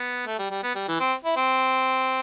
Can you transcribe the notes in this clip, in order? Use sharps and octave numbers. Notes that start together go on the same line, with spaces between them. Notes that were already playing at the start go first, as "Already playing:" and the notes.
Already playing: B3
A3
G3
G3
B3
G3
E3
C4
E4
C4